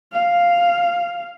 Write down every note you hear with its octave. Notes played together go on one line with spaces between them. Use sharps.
F5